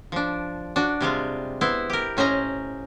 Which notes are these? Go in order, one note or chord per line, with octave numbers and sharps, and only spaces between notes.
F3 D4
D4 F#4
C3 G3 G#3 F4
B3 E4 C5
G4 A#4
A2 C#4 C5 D#5 A#5